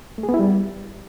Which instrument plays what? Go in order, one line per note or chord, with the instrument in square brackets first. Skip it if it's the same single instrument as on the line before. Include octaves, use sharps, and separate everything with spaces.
[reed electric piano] A3
G#4
B3
E4
G3